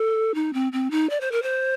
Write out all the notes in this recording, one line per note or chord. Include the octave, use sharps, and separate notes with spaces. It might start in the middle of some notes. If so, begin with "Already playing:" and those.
Already playing: A4
D#4
C4
C4
D#4
D5
C5
A#4
C5